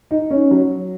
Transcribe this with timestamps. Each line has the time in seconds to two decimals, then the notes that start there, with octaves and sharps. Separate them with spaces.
0.11 D#4
0.31 C#4
0.51 F#3